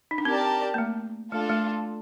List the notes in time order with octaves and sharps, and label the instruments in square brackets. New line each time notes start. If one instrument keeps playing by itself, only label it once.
[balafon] D#4
D4
[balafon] C4 [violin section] G4 A#4 D5 A5
[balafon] A#3
A3
[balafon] A3 [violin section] D4 F4 A4
[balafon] A3